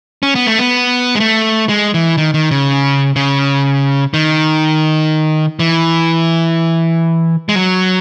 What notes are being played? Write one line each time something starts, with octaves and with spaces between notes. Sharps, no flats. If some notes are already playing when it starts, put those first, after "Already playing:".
C#4
B3
A3
B3
G#3
A3
G#3
E3
D#3
D#3
C#3
C#3
D#3
E3
G#3
F#3